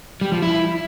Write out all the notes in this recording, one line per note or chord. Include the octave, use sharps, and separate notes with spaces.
G3
F3
E4